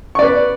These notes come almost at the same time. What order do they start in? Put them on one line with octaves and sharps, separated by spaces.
C#6 D5 B4